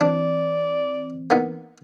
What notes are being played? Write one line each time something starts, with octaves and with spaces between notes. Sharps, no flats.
E3 C4 D4 D5
A#3 B3 D#4